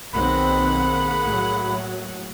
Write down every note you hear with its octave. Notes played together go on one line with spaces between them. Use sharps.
B1 D#3 A#3 C4 G#4 F#5 B5
A2 F#3